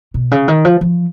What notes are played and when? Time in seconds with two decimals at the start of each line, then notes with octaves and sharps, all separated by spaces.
0.14 B2
0.31 C#3
0.48 D#3
0.65 F3
0.81 F3